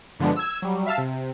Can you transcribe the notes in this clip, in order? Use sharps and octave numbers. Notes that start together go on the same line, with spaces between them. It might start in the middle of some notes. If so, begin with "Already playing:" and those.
G2 D3 F3 G#3 B3 D4
E6 G#6
F#3 G3
E5 F5 A5 E6
C3